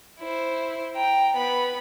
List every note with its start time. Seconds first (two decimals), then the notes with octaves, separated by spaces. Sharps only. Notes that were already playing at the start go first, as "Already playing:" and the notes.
0.20 E4 C5
0.96 G5 A#5
1.36 B3 B5